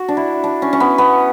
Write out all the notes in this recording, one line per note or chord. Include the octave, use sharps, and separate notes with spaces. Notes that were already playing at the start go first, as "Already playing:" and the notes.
Already playing: F#4
D4
E4
D4
C#4
C#4
B3
B3